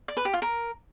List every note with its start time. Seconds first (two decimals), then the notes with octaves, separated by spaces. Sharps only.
0.08 D5
0.17 B4
0.25 G4
0.33 F4
0.42 A#4